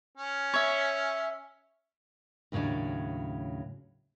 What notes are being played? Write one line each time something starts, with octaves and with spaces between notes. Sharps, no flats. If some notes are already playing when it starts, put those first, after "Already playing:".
C#4
C#5 E5
D#2 A2 C#3 F#3 D4